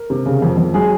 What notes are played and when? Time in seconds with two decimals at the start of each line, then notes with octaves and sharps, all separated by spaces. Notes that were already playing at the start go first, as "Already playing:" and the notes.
Already playing: A#4
0.10 C3
0.26 C#3
0.42 F2
0.58 F2
0.74 F#3 G#4